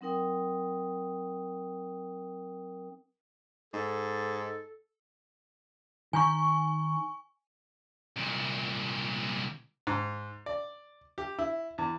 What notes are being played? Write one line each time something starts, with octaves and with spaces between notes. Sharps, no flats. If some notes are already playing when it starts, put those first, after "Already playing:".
F#3 C4 D#4 A#4 G5 D#6
G#2 A4
D#3 G#5 A#5 C#6
C2 A#2
G#2
D5
G4
E4
E2